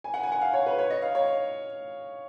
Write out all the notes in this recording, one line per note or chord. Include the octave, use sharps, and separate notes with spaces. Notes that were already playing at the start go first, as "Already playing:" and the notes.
G#5
F#5
G#5
F#5
F5
C#5
B4
C#5
D#5
F5
C#5